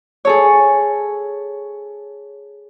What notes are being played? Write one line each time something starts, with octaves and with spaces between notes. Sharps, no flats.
G#4 A4 C#5